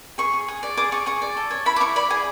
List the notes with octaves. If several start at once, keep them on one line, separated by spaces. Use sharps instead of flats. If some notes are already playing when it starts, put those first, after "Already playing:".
G#4 C#6
G#4
G#4
D5
G#4 D6
G#4 C#6
G#4 C#6
D5
A4
C#5
E4 B5
D6
E4 C#6
D5 B5
G#4 G#5